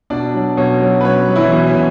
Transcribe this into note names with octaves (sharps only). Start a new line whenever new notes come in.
B2 D4 D5
F#3
B2 C#4 C#5
F#3
B4
B2 C#4 C#5
F#3
E3 E4
B2
C#4
B2